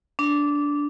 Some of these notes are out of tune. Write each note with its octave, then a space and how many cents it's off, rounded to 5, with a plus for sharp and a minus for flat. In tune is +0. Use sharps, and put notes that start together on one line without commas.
D4 -15